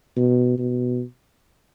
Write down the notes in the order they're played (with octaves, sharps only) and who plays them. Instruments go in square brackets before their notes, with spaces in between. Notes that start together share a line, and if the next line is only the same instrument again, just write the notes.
[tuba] B2
B2